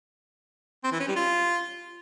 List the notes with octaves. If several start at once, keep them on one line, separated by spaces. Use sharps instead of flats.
C4
E3
C#4
G3
F4